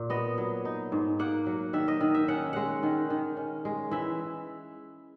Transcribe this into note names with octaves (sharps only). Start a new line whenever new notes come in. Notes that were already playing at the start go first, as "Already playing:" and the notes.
Already playing: A#2
B3 D#5
F#3
D#4
G#2
A#3 F#5
F#3
D#3 E5
D#5
D#3
E5
C#4 F#5
G#3 F#5
D#3
D#3
C#4
G#3
E3 E5